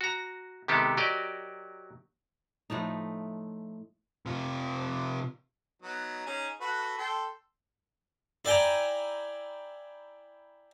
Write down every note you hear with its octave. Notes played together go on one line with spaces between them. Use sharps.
F#4 A#5
C3 D#3 G#3 B3 G4 A4
F#3 G4 A#4 D5 D#5
A2 F3 A3 D#4
C3 F4
F#3 B3 D#4
C#4 D#4 G#4
F#4 A4 B4
A4 G5 C6
E4 D5 G5 G#5 A#5